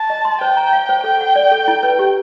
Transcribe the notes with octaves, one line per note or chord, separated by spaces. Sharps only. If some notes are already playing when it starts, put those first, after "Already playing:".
Already playing: A5
D#5
C6
C5 G5
A#5
F5
C5
A4 G5
F#5
D5
A4
E4
B4
G4